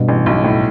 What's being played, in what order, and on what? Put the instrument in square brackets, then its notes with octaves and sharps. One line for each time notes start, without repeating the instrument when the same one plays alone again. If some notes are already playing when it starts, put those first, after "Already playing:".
Already playing: [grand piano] G2 B2
[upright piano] A1
B1
A2